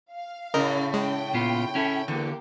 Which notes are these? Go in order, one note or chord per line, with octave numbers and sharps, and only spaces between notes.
F5
A2 C#3 A#4 D#5
G#3 G5
A#2 B3 F4
C#4 E4 A4
E2 D3 A#3 G4